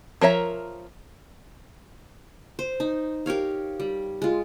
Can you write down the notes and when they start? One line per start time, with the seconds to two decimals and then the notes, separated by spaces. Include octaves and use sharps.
0.21 F3 A#4 C#5 E5 A#5
2.59 C5
2.80 D#4
3.26 G4 A#4 C#5 F5
3.80 G3
4.22 G#3 F4